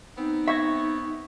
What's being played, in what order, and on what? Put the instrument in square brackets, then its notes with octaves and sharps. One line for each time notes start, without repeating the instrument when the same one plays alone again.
[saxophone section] B3 C4 [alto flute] D#4
[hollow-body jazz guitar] E5 [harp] C#6 G#6 A#6